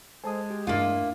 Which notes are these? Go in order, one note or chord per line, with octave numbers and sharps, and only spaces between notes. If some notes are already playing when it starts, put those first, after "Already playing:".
G#3 A4 C5 G#5 A5 D#6
G4
E2 G2 A3 A#3 D4 E4 F4